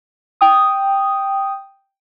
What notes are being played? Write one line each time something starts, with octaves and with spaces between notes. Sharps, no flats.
G5 D#6